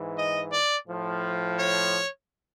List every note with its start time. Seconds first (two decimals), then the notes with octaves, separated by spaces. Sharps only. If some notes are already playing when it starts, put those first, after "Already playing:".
Already playing: G#2 E3
0.16 D#5
0.51 D5
0.87 A2 F3
1.58 C#5